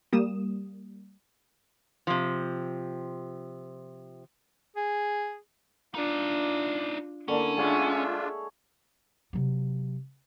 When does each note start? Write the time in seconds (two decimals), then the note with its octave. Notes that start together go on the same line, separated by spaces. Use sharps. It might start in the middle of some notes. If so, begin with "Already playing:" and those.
0.13 G3 A#3 D#6 E7
2.07 C3 F3
4.76 G#4
5.95 D4 D#4 F4 D5
7.28 D3 A#3 C#4 D4 E4
7.57 G#3 D4 F4 G#4 C#5 E5 F#5
9.33 C3 F#3